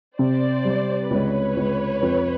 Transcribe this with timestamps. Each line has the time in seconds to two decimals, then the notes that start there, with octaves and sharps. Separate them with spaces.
0.19 C3 C5 D5
0.65 G3
1.10 C#2 B4 C#5
1.56 C#2
2.02 F2